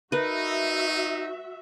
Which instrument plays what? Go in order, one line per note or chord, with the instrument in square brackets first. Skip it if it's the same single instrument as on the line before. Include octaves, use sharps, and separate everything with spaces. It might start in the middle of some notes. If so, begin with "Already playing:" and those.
[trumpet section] D#4 [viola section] F#4 E5 [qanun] A#4 B4